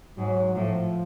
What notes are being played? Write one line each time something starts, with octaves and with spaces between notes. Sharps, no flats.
G#2 F#3
A2 F3